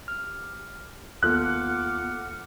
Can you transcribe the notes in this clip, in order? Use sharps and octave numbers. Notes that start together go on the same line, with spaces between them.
G4 F6
D#2 B3 F4 A4 F#5 D6 F6 F#6